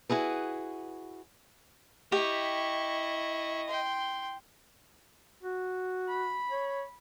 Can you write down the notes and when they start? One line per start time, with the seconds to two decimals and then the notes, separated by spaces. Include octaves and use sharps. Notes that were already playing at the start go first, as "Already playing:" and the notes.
0.09 E4 F#4 G#4 B4
2.12 E4 G4 D#5 C#6
3.68 G5 C6
5.43 F#4
6.08 B5
6.50 C#5